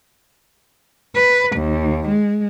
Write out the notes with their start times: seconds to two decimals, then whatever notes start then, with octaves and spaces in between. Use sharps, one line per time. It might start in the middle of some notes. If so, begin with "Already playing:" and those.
1.15 B4
1.55 D#2
2.06 G#3